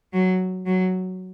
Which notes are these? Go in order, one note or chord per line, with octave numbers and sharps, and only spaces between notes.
F#3
F#3